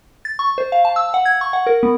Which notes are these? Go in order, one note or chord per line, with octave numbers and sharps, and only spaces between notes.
A6
C#6
C5
F5
A5
E6
F#5
G#6
C#6
F#5
A#4
B3